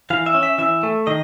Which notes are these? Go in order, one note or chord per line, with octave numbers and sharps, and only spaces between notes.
E3 F5
E5
C#4
E5
E3 E5
A3
D#3 D#5